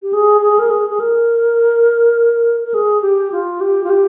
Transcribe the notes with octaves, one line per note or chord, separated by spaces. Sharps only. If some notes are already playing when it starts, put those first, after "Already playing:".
G4
G#4
G#4
A#4
G#4
G#4
A#4
A#4
G#4
G4
F4
G4
F4
G4